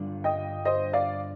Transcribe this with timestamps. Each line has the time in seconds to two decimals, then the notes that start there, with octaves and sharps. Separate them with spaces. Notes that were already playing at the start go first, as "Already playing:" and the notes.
Already playing: G2 D3 G3 D4 F4
0.24 D#5 G5
0.65 C5 D#5
0.93 D5 F5